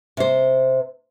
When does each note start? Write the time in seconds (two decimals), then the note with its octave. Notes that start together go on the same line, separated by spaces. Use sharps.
0.17 C3 C5